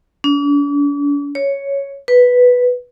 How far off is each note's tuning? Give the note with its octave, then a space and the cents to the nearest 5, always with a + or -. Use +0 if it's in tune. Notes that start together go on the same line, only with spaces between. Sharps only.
D4 -45
C#5 +0
B4 +0